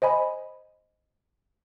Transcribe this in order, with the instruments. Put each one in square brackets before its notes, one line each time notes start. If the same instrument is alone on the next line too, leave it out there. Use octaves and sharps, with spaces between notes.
[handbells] C5 D#5 G#5 B5